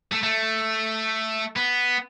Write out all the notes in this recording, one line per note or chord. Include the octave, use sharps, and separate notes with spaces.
A3
A3
B3